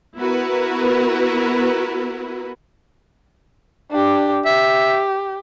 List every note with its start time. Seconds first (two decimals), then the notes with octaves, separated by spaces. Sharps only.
0.17 B3 E4 F#4 A#4 B4
3.91 D4 G4
4.46 G4 E5